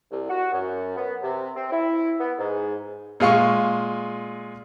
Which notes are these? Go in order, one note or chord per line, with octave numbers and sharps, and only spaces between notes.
C2
F#4
F#2
B3
C3
C4
E4
B3
G#2
A#2 G#3 F5 C#6